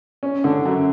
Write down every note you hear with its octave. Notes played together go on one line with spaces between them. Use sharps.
C#4
D3
F#2